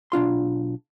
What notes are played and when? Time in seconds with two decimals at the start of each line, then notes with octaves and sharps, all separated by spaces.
0.12 B1 D4 F4 C6